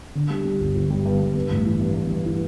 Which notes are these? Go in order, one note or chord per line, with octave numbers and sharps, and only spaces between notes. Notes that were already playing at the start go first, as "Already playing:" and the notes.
D3
G3
G3
G1
G1
G3
G2
G2
G2
A1
E3
G2
G2
G2
E3